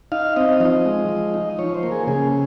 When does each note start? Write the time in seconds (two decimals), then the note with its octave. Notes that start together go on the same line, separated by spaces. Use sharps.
0.12 D#4 F5
0.36 C4 D#5
0.60 F3 D#5
0.85 G#3
1.09 F3
1.34 D#4
1.59 F3 C#5
1.74 C5
1.83 A#3
1.92 G#4
2.07 C#3 G#4